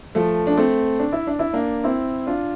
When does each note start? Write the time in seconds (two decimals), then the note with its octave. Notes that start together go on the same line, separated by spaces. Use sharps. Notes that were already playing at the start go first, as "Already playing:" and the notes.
0.15 F3 A3
0.47 D4
0.57 A3 C4
0.99 D4
1.12 E4
1.27 D4
1.39 E4
1.53 A#3 D4
1.84 C4 E4
2.27 D4 F4